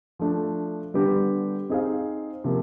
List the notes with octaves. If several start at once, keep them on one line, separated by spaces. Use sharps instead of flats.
F3 A3 D4
D3 G3 B3 D4 G4
C4 D#4 G#4 C5 F5
C3 F3 A#3